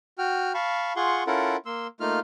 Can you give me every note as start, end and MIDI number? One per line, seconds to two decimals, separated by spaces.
0.18 0.52 66
0.18 0.52 79
0.18 0.52 89
0.54 0.93 77
0.54 0.93 81
0.54 0.93 83
0.54 0.93 85
0.96 1.24 65
0.96 1.24 68
0.96 1.24 78
0.96 1.24 84
0.96 1.24 85
1.27 1.56 61
1.27 1.56 64
1.27 1.56 65
1.27 1.56 69
1.27 1.56 70
1.27 1.56 78
1.66 1.87 58
1.66 1.87 84
1.66 1.87 88
2.00 2.19 57
2.00 2.19 58
2.00 2.19 63
2.00 2.19 65
2.00 2.19 89